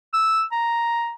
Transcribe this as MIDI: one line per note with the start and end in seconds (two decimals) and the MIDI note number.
0.14 0.43 88
0.52 1.14 82